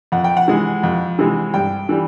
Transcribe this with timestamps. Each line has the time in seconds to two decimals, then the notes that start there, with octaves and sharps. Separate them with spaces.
0.12 F2 F#5
0.24 G5
0.37 F#5
0.48 C3 E3 G#3
0.83 F2
1.19 C3 E3 G#3
1.54 G2 G5
1.89 E3 G3